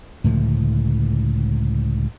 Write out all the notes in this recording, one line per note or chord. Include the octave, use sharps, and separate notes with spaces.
C#2 A2 D3 F3